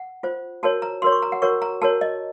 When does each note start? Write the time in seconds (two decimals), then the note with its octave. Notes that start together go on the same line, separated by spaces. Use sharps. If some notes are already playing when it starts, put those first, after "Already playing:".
Already playing: F#5
0.23 F4 C5
0.63 F#4 A#4 C#5 A5
0.82 A#5
1.02 F#4 A#4 C#5 C6
1.12 C#6
1.22 A#5
1.32 F#5
1.42 F#4 A#4 C#5 C#6
1.62 A#5
1.82 F#4 A#4 C#5 A5
2.01 D#5